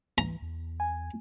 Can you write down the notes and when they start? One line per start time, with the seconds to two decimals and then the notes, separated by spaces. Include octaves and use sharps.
0.18 E3 A#5
0.42 E2
0.80 G#5